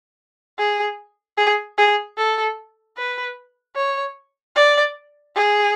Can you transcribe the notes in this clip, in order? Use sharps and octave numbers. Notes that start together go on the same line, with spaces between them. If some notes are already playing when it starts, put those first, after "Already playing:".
G#4
G#4
G#4
A4
B4
C#5
D5
G#4